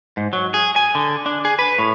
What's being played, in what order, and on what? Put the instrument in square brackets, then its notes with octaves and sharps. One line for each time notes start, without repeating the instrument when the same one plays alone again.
[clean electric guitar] G#2
F#3
G#4
G#5
D3
D4
G#4
B4
A2